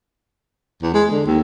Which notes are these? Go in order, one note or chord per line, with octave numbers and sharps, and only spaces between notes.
E2
G#3
D3
D#2